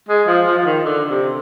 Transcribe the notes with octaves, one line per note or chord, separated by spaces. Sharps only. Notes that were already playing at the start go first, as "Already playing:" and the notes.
G#3
F3
F3
F3
D#3
D3
C3